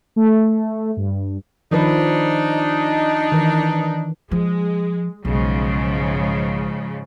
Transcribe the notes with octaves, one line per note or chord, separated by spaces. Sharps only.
A3
G2
D#3 F3 D4 D#4 B4
D#3 E3
F3 G#3
B1 G#2 C#3 F3